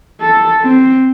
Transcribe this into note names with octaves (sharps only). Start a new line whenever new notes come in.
A4
C4